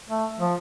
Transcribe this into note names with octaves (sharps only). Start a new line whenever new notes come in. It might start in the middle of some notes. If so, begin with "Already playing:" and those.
A3
F3